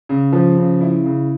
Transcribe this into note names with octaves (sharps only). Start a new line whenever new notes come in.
C#3
F3
C#3
E4
C#3